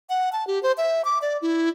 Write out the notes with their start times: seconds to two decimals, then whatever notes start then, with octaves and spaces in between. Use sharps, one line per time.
0.10 F#5
0.32 A5
0.47 G4
0.63 C5
0.78 E5
1.05 D6
1.22 D5
1.42 E4